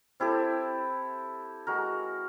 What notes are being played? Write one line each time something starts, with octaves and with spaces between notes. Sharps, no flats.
C4 E4 G4 A4
G#3 F#4 A#4